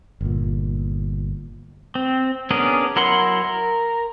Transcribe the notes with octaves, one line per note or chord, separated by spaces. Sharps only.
G1 A#2
C4
B3 C#4 D4 G#4 A#4
F#3 E4 A#4 F#5 C6
A#4